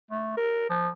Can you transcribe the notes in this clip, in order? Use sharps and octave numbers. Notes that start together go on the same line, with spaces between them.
A3
A#4
F3